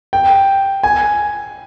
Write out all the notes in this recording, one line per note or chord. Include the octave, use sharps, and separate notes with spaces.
G5
G#5